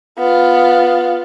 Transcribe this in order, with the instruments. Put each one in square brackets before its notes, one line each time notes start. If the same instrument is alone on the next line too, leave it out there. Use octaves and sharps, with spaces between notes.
[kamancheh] B3 F4